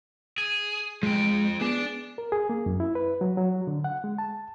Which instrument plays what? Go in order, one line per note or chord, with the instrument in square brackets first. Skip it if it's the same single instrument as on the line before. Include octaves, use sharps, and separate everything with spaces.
[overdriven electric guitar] G#4
[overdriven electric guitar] F3 G5 [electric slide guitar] G#3
[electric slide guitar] B3 G#4 [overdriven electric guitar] D4
[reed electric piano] A#4
G#4
A#3
F#2
E4
B4
F#3
F#3
D3
F#5
G#3
A5